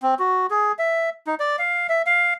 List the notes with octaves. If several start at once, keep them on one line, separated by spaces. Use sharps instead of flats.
C4
F#4
G#4
E5
D#4
D5
F5
E5
F5